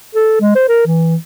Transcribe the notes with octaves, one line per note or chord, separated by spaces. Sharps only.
A4
G#3
C5
A#4
E3